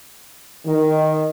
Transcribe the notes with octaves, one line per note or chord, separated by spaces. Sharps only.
D#3